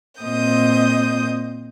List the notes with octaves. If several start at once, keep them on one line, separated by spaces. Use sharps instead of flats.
A#2 C4 D#5 D#6 G6